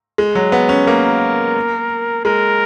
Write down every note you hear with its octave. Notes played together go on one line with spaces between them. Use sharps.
G#3
F#3
B3
C#4
A#3 A#4
G#3 A#4